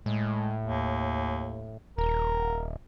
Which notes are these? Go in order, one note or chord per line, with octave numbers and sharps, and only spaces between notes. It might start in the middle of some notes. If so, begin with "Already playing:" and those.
A2 G#3
D#2
D#1 A#4